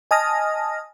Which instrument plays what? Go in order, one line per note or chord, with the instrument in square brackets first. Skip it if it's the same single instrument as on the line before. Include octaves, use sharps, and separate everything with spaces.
[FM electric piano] D#5 G#5 A5 D#6 F6 A#6